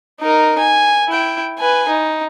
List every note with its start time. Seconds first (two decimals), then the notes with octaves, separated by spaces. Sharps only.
0.21 D#4 A#4
0.58 G#5
1.09 E4 G5
1.59 B4 G#5
1.89 D#4